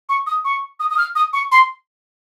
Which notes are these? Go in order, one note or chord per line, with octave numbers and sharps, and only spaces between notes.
C#6
D#6
C#6
D#6
D#6
F6
D#6
C#6
C6